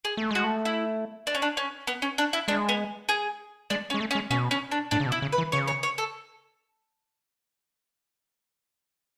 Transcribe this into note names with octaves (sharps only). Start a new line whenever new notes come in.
G#4
A3
G#3 F#4
A3
E4
D4
C#4
D4
C#4
B3
C#4
D4
E4
G#3 D4
B3
G#4
G#3 D4
C#4
G#3
A3
C#4
G#3
B2 C#4
C#4
D4
A2 D4
C#3
B2
E4
C#3
B4
E3
C#3 C#5
C#5
C#5
A4